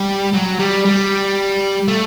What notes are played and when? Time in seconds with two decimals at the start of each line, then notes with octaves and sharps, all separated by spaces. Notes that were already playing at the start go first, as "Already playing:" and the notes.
Already playing: G3
0.33 F#3
0.59 G3
0.85 G3
1.88 A3